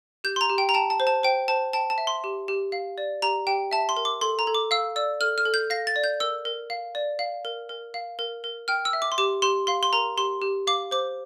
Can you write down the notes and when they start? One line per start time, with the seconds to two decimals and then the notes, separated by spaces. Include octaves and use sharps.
0.24 G4 G6
0.36 C6
0.41 A#5
0.50 G4
0.58 G5
0.69 A#5
0.74 G5 A5
0.90 A5
1.00 C5
1.07 A5
1.23 C5 G5
1.48 C5 A5
1.73 G5 A5
1.90 A5
1.98 E5
2.07 C6
2.24 G4
2.48 G4
2.72 F5
2.98 D5
3.22 G4 A#5
3.47 G4 G5
3.71 E5 A5
3.89 C6
3.97 A#4
4.05 D6
4.21 A4 C6
4.39 A#5
4.47 A4
4.55 D6
4.71 F5 E6
4.96 D5 E6
5.20 A4 F6
5.38 F6
5.45 A4
5.54 G6
5.70 F5 A#6
5.87 A6
5.96 D5
6.04 G6
6.20 A#4 E6
6.45 A#4
6.70 F5
6.95 D5
7.19 F5
7.45 A#4
7.69 A#4
7.94 F5
8.19 A#4
8.44 A#4
8.68 G5 F6
8.85 E6
8.93 E5
9.02 D6
9.12 C6
9.18 G4 D6
9.42 G4 C6
9.67 F5 C6
9.83 C6
9.93 A#4 A#5
10.17 G4 C6
10.42 G4
10.67 F5 D6
10.91 C5 D6